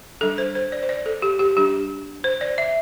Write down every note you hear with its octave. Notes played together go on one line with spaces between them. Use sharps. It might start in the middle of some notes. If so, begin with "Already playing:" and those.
G3 D4 A4
C5
C5
D5
C5
D5
A4
G4
G4
G3 D4 G4
C5
D5
E5